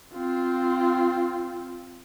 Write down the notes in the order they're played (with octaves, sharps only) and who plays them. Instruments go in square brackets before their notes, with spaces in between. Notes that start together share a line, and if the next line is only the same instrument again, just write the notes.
[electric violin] C4 F4